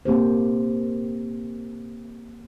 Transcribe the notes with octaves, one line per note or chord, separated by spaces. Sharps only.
A#3 C4 G4 C5